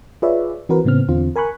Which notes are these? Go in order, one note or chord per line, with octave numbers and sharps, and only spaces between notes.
F4 G#4 B4 C#5 D5 E5
E3 C4 F#4 A#4 B4
A2 C#3 B3 C4 F6
E2 D3 C4 F4
A#4 G#5 B5 C#6 F#6